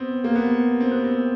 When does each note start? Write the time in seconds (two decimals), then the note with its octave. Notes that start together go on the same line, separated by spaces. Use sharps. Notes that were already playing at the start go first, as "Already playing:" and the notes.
Already playing: B3 C4
0.24 A#3
0.36 B3
0.80 C4
0.91 B3
1.04 C4